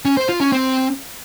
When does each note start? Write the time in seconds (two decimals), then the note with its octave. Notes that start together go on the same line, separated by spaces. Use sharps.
0.05 C#4
0.17 C5
0.29 F4
0.41 C#4
0.52 C4